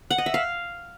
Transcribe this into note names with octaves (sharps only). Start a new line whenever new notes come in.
F#5
D#5
E5
F5